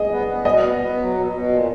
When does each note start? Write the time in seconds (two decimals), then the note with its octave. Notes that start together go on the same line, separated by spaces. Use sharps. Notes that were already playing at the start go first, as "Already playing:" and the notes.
Already playing: G#4 D#5
0.10 B3
0.28 B3
0.45 B2 D#5
0.62 B3
0.80 B3
0.97 F#3
1.14 B2
1.32 B2
1.49 A#2